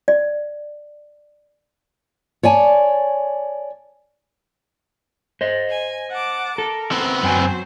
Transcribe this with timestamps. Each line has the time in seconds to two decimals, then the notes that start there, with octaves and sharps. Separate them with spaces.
0.08 D5
2.43 C#5 D5 G#5 A5
5.41 C5 D#5
5.69 G#5
6.12 F#5 A5 D6
6.58 A4 A#4
6.92 B3 C4
7.23 F#2 F#3 C5 G5 G#5